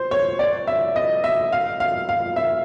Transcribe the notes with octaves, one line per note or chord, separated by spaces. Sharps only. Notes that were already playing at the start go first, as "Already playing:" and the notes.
Already playing: C5
C#5
D5
E5
D#5
E5
F5
F5
F5
E5